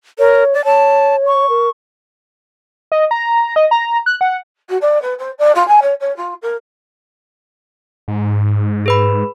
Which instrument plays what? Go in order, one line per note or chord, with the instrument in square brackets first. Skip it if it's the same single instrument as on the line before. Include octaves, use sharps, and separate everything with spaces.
[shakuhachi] A#4 [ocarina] C#5
[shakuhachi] D5
[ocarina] C#5 [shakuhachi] A5
[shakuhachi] C#6
[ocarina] A#4
[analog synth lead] D#5
A#5
D#5
A#5
F#6
F#5
[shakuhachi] F#4
D5
B4
C5
D5
F4
G#5
C#5
C#5
F4
A#4
[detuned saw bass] G#2
[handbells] G#4 B4 B5